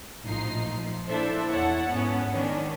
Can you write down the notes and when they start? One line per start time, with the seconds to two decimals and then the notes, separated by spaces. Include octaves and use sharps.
0.25 A#1 A2 F3 D#4 C7
0.72 A#2 F3
1.09 A#3 D4 E4 A4 C5 E5
1.50 E2 E4 C#5 F#5 A5
1.90 G#2 B3 C#4
2.31 D#3 C#4 D4